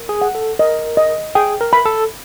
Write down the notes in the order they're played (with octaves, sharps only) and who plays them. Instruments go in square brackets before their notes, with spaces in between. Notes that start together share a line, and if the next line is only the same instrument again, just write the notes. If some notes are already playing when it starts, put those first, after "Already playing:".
Already playing: [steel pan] A#4
[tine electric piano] G#4
[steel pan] F#5
[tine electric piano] A4
[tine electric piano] A#4 [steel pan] D#5
[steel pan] D#5
[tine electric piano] G#4 [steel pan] G5
[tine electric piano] A#4
[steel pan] B5
[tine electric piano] A4